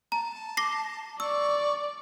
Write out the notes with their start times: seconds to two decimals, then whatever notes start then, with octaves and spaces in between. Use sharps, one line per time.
0.12 A5 A#5
0.57 D6 A#6 C7
1.20 D5 C#6 E6